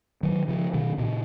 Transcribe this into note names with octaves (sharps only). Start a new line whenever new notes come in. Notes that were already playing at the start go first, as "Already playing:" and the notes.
D#3 F#3
C#3 F3
B2 D#3
A#2 C#3